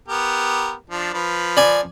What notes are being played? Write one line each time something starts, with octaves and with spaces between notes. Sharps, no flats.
B3 G4 A#4
F3 D4
F3 B4
D5 G#5